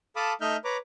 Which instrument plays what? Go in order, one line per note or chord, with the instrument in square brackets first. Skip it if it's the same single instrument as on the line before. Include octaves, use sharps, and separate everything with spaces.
[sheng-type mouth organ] A4 F5 A5 B5 D6 D#6
A3 D#4 D#5 E5 F6 G6
B4 C#5 A#5 D6